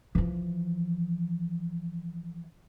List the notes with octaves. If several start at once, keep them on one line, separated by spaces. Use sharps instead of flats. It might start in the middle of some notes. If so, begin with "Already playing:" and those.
E3 F3